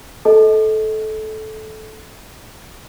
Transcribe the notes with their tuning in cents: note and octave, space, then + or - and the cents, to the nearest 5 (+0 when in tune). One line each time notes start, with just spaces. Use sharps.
A4 -20 D#5 +25 A5 -20